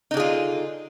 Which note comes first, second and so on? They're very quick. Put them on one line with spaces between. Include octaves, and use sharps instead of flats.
D#4 D3 G#4 F4